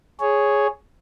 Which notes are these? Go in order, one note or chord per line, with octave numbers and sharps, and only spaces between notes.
G#4 C#5